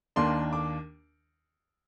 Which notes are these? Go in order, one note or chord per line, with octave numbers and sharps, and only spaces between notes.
D#2 D#3 A#3 D4 C6
D6